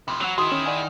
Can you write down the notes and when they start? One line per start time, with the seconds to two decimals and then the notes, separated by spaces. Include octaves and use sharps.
0.08 C3 F3 B5
0.21 F#3 C4 F#5
0.38 D#3 E4 F#4 G#4 C6 D#6
0.52 C#4
0.66 D5 F#5 G#5